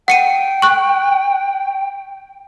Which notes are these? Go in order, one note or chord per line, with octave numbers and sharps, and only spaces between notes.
F#5 G5 C#7 D#7
C#6 F#6